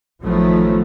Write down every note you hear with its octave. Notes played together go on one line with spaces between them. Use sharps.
A1 D#3 F3 F#3 A3 B3